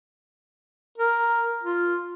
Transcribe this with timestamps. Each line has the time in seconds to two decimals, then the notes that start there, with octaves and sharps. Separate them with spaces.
0.98 A#4
1.63 F4